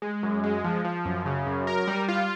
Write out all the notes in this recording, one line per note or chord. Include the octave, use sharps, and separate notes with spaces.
G#3
F#2
G#3
F3
F3
F#2
C#3
F#2
A#4
G3
F4